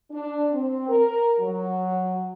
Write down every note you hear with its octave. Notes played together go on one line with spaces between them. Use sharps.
D4
C4
A#4
F#3